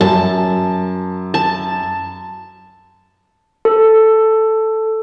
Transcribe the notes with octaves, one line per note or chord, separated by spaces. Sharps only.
F#2 A5
A5
A4